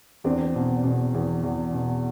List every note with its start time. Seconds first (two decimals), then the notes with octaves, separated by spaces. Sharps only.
0.24 E2 C4 D4
0.55 B2
0.84 B2
1.14 E2
1.43 E2
1.73 B2